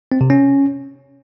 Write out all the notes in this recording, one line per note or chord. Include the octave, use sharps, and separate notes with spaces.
C4
C3
C#4